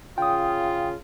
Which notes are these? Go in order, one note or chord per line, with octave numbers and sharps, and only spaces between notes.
C#3 F4 G5 D#6